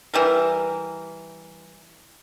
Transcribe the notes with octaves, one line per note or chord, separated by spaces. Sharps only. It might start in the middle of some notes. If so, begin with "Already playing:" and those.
E3 G3 A#4